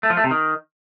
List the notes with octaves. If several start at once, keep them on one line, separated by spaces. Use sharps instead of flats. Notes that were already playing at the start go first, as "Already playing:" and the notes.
A3
F3
A3
C3
D#3